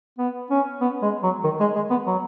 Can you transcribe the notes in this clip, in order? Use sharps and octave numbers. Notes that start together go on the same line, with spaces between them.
B3
C#4
B3
G#3
F#3
D#3
G#3
G#3
B3
F#3